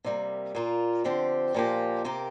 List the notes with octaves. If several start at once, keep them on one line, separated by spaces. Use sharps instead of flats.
C3 G3 A#3
A#2 A#3 F4
D3 F3 C4 G4
A#2 F3 A#3 G4
C3 A#3 G4